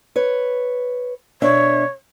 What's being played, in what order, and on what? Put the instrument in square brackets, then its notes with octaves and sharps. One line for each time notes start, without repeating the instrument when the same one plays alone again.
[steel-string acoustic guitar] B4 C#5
[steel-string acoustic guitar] B2 D4 E5 [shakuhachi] C#5